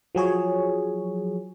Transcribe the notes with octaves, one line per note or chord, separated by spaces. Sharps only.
F3 F#3 G#4 C#5